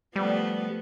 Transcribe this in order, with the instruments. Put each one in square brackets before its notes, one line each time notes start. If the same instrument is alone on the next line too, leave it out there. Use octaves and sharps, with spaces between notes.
[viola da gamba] F3 A3 B3 [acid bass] G3